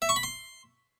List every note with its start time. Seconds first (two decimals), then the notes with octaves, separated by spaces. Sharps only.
0.02 E5
0.09 C#6
0.16 B5
0.23 C6